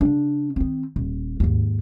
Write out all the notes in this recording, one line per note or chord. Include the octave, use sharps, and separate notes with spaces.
C#3 D4
D#3 C4
D#1
D#2 G#2